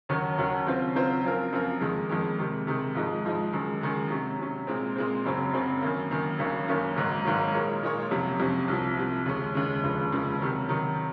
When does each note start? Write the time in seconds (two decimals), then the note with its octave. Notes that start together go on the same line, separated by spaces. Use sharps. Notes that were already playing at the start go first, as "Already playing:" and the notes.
0.09 D#2 D#3 F#3 C#4 F#4
0.38 D#2 D#3 F#3 C#4 F#4
0.67 C#3 F#3 C4 F4 C5
0.95 C#3 F#3 C4 F4 C5
1.24 F#2 F3 C4 F4 A#4
1.53 F#2 F3 C4 F4 A#4
1.81 F2 D#3 G#3
2.10 F2 D#3 G#3
2.38 C3 D#3 G#3
2.67 C3 D#3 G#3
2.95 G#2 F3 G#3 D#4
3.25 G#2 F3 G#3 D#4
3.53 F#2 D#3 G#3
3.81 F#2 D#3 G#3
4.10 C3 F#3 C#4
4.39 C3 F#3 C#4
4.67 A#2 G#3 C4
4.96 A#2 G#3 C4
5.25 F#1 F#2 C#3 F#3 C4
5.53 F#1 F#2 C#3 F#3 C4
5.82 F#2 D#3 A#3
6.11 F#2 D#3 A#3
6.39 G#1 F#2 D#3 A#3 C#4
6.68 G#1 F#2 D#3 A#3 C#4
6.96 G#1 G#2 D#3 F#3
7.25 G#1 G#2 D#3 F#3
7.54 A#2 G#3 D#4 A#4 C#5
7.83 A#2 G#3 D#4 A#4 C#5
8.11 F2 C3 F#3 C#4
8.40 F2 C3 F#3 C#4
8.68 C2 C3 F3
8.97 C2 C3 F3
9.26 D#2 C#3 G#3 C#4
9.54 D#2 C#3 G#3 C#4
9.83 F1 D#2 C#3 F3 G#3
10.12 F1 D#2 C#3 F3 G#3
10.40 C3 D#3 F#3
10.69 C3 D#3 F#3